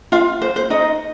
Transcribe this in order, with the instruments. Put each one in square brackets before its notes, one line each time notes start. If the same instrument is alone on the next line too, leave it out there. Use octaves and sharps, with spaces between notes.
[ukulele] F4 F5
C5
C5
D#4 D#5